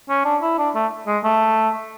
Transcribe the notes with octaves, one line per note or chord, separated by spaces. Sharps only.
C#4
D4
E4
D4
A3
G#3
A3